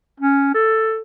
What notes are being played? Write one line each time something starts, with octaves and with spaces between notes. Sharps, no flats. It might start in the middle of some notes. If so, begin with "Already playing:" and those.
C#4
A4